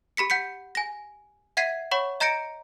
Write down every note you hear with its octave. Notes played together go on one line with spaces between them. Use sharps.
G4 B5 B6 C#7
F#5 G6 B6 C#7
G#5 A#6
E5 F#5 G#6 B6 C7 D#7
C#5 F#5 B5 C#6
D#5 A#5 G6 A#6 C#7 D7